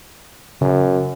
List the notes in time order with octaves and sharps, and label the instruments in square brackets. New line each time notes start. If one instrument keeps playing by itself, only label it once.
[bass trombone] F#2 [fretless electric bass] C#3